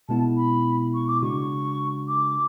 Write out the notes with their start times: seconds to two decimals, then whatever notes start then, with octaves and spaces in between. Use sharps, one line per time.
0.09 B2 G#3 B3 E4 A5
0.37 B5
0.94 C#6
1.08 D6
1.22 C#3 G#3 D4 F#4 C#6
2.08 D6